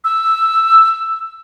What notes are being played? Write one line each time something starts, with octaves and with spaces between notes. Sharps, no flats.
E6